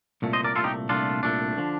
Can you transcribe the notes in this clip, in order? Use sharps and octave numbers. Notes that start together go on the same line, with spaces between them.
C2 A#2 A3
C5 D#5
A#4 D5
C2 A#2 A3 F4 A4
D#4 G4
C2 A#2 A3 D4 F4
C2 A#2 A3 D4
D3 F3